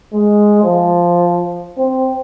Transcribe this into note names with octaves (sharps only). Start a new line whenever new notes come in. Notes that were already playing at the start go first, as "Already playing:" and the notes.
G#3
F3
C4